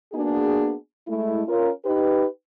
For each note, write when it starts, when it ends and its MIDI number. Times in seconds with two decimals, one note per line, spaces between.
0.13 0.74 58
0.13 0.74 59
0.13 0.74 62
0.13 0.74 66
0.13 0.74 68
1.08 1.41 56
1.08 1.41 57
1.08 1.41 64
1.48 1.70 61
1.48 1.70 65
1.48 1.70 70
1.85 2.25 63
1.85 2.25 67
1.85 2.25 71